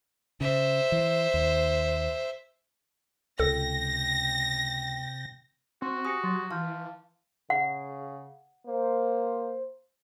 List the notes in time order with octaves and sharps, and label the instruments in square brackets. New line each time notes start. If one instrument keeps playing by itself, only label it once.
[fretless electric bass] C#3 [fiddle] C5 E5
[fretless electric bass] E3
D#2
[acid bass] C#2 [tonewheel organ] C3 G5 [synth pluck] A4 [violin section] A#6
[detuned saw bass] C4 [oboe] F#4 [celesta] C6
[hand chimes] G4 D#6 [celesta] G#5 A#6 C#7
[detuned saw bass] F#3 [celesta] C6 A6
[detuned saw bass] E3 [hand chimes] F5 A5 [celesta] C6 F6 G6
[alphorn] C#3 [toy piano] F#5
[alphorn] A#3 [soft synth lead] C5